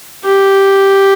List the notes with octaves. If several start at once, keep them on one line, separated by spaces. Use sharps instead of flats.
G4